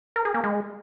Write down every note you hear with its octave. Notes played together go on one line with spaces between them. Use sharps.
A#4
G#4
A#3
G#3